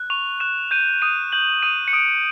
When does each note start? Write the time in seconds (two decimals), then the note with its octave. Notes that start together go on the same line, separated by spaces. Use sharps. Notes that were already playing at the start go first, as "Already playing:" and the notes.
Already playing: F#6
0.10 C#6 F7
0.40 F#6 E7
0.71 G6 D#7
1.02 D#6 D#7
1.32 G6 F#7
1.63 D#6 D#7
1.88 C#7
1.93 D#6 D7